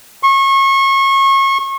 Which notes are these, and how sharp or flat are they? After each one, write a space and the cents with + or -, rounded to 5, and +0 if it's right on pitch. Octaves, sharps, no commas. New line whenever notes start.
C#6 -30